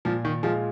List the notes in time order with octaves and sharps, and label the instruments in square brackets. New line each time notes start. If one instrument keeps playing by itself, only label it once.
[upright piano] A#2 [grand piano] F3
[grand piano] D#3
[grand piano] F3 [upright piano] G#3 F4 G#4